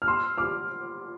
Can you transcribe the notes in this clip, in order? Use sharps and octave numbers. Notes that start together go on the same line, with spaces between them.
F6
C6 E6
D6 F6